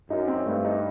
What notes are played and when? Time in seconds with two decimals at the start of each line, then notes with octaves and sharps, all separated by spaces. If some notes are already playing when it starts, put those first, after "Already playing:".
0.10 F#2 D#4
0.28 C4
0.46 G2 A3
0.65 D#4